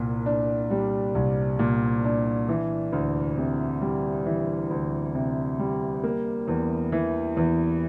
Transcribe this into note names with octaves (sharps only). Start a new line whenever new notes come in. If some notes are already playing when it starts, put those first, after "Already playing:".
Already playing: C2 A#2
D4
G3
C2
A#2
D4
E3
D2
C3
G3
E3
D2
C3
G3
A#3
E2
E3
E2